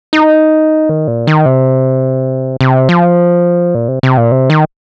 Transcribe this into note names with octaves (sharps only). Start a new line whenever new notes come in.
D#4
D#3
A#2
D#3
C3
C3
F3
A#2
C3
C3
A#2
C3
D#3